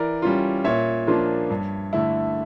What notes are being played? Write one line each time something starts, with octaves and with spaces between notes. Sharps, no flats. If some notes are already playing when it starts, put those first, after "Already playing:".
Already playing: E3 A#4 D5
G3 C#4 F4
A#2 C#5 E5
F3 A#3 D4 F4
G2
D3 A3 E4